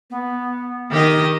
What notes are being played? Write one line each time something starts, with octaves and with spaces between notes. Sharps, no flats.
B3
D#3 G4 D#5